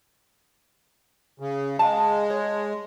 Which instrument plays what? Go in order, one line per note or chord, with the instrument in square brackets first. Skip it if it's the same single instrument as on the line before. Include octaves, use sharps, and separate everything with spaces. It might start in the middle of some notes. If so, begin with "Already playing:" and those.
[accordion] C#3
[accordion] G#3 [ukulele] F5 A5
[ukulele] C#5